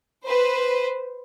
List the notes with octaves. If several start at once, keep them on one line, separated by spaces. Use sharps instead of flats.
B4 C5